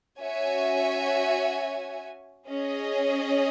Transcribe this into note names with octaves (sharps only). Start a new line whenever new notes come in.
C#4 F#4 C#5 E5 G#5
C#4 G#4 D#5